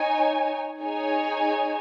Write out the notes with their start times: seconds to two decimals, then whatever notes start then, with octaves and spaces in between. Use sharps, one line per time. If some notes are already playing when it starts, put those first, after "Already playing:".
Already playing: D#4 C#5 G#5
0.80 D#4 G#4 C#5 G#5